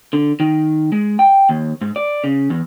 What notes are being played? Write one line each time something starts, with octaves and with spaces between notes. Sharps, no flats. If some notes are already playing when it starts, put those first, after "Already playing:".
D3
D#3
G#3
G5
D#2
G#2
D5
C#3
E2